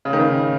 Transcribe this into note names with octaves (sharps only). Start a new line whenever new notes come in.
C#3
D#3
C#3